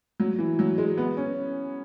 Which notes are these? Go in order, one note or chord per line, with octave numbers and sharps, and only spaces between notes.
F#3
E3
F#3
G#3
B3
C#4